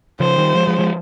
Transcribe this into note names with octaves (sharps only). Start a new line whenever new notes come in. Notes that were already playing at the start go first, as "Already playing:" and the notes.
C#3 F3 C5
D#3 G3
F3 G#3
F3 G#3
F3 G#3